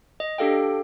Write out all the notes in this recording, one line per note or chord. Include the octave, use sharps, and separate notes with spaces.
D#5
D4 G4 A4 F5 G5